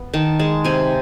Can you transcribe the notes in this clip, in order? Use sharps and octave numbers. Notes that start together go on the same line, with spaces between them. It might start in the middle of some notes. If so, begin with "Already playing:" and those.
Already playing: B3
D#3 A5
G#3 A5
C3 G#5